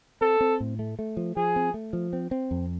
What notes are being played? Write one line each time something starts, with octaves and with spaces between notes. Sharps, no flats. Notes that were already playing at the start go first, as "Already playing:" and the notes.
C4 A4
C4
A2
A3
A3
F3
F3 G#4
C4
A3
F3
C4
C4
F2